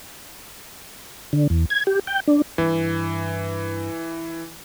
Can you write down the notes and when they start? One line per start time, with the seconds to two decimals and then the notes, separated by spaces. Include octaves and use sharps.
1.33 D3
1.50 E2
1.70 G#6
1.87 G4
2.07 G5
2.28 D4
2.58 G2 E3